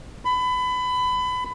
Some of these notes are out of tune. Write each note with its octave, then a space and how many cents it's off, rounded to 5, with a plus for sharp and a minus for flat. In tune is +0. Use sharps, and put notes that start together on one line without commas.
B5 +25